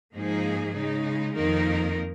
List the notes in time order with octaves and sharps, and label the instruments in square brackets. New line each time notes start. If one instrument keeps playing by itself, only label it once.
[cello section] G#2 F3 A#3 D#4 G#4
C#3 G#3 D#4
F2 D#3 A#3 D#4 A#4